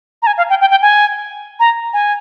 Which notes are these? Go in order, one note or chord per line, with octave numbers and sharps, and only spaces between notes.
A#5
G#5
F5
G5
G5
G5
G#5
A#5
G#5